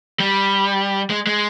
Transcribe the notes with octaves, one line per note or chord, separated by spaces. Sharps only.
G3
G#3
G#3